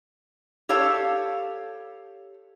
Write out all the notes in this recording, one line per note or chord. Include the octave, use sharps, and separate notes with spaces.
G4 A4 C#5 F5 A5